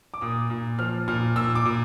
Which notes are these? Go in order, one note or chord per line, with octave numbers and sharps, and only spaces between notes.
D6
A#2 D#6
A#2
F3 F6
A#2 F6
A#2 E6
D6
A#2